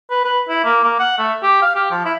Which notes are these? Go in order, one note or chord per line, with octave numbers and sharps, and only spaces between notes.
B4
B4
E4
A#3
A#3
F#5
A3
G4
F5
G4
F3
E4